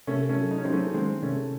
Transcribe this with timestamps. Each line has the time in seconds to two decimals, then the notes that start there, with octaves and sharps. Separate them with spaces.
0.07 C3 A3 C#4
0.29 A3 C#4
0.36 F#3
0.51 D#4
0.58 C#4
0.65 F#3 C4 D#4
0.73 A3 C#4
0.94 D#3 G#3 C4
1.23 C3 A3 C#4